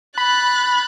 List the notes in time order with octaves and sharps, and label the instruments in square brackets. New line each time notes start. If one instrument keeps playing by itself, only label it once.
[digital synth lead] B5 [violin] F#6 A6